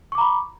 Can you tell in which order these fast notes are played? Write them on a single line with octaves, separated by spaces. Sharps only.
C#6 D6 A#5 B5